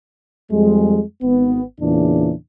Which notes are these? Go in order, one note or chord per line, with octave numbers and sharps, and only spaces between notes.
F2 G3 G#3
G#1 B3
E2 A#2 C#3 E3 D4